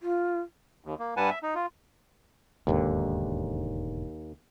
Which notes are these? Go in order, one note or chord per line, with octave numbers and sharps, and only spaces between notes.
F4
D#2
A#3
G2 G3 B4 F#5 G#5 A5
E5
D#4
F4
E1 D#2 G#2 D3